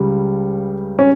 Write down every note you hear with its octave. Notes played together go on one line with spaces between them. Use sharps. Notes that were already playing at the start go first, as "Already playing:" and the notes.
Already playing: C#2 C#3 G3
C#4